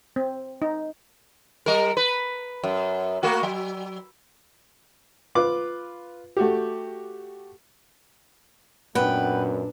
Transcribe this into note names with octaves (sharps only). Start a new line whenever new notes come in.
C4
D#4
G3 A#4
B4
F#2
A3 A#3 F#4
F#3
F4 B4 D6
A3 F#4 G4
F#2 A#2 B3 D4 B4 G5